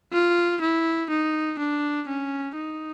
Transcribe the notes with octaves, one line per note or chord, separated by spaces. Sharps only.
F4
E4
D#4
D4
C#4
D#4